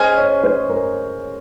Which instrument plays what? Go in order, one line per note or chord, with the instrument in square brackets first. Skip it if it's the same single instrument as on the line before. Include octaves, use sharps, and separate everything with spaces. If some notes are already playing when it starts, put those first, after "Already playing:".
Already playing: [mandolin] C#4 G#4 D#5 G#5 [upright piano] C5
[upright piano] C#5
C5
A#4